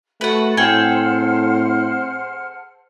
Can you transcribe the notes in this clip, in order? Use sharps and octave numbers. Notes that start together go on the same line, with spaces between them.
A3 F#4 B4 F#5 A5
A2 C4 G#4 A4 C5 F#5 G5 F6